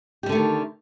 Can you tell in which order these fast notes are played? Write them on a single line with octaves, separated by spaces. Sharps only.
G4 G3 D3 A3 D#3